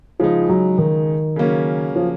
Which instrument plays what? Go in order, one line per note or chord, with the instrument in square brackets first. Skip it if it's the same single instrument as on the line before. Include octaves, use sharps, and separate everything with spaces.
[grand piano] C#3 G#3 D#4 [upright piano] F3
[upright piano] F#3
D#3
[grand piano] C#3 F#3 A#3 C#4
[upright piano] F3